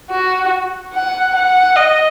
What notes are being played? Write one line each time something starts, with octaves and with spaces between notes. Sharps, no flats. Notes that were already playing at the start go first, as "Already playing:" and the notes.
F#4
F#5
F#5
D#5